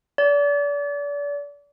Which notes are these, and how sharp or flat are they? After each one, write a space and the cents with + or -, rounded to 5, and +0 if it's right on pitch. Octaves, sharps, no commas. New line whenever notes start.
D5 -35